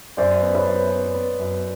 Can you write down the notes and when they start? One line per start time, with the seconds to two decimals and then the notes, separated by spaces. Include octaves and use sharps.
0.17 F#2 C5 D5
0.42 B3
0.54 B4 C#5
0.67 F#2
0.90 B3
1.15 B3
1.39 F#2